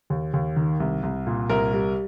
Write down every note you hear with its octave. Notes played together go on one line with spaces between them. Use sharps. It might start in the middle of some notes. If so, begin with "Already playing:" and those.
D#2
D#2
D#3
C2
C2
A#2
C2 A#4
G3